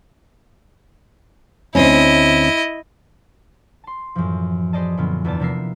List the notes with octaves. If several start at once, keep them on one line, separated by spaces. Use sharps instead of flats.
D2 C4 C#4 E4 D#5
A5 C6
F#2 A2 E3 F3
G#4 B4 C5 D5 D#5 A5
F#2 A#2 D3 B3 F4
E2 B3 D5 A5
C3 F3 B3 A#4 E5 C7